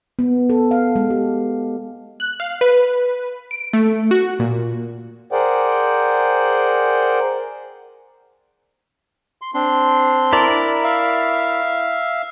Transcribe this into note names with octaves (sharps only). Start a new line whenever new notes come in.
B3
A4
F5
G#3
G4
F#6
F5
B4
D7
A3
F#4
A#2
G#4 A#4 C5 D5 F#5 G5
C6
C4 D4 C6
E4 A#4 D5
E5 F5